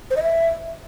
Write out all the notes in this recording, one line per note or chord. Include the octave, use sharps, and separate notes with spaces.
C5
D#5
E5